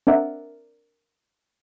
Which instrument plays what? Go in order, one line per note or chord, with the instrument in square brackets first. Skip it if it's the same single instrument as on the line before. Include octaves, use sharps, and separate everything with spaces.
[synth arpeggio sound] C4 D4 A#4 D5 E5 F#5